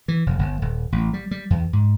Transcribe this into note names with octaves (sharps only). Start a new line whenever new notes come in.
E3
F1
G1
D#1
A1
G3
G3
E2
G#2